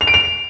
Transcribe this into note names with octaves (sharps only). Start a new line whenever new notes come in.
F7
D7
F7